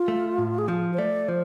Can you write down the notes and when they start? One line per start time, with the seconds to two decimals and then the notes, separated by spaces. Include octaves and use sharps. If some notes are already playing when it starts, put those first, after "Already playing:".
Already playing: F4
0.08 A3
0.38 A2
0.58 G#4
0.68 F3 F4
0.94 C5
0.98 A3 D5
1.28 F3 C5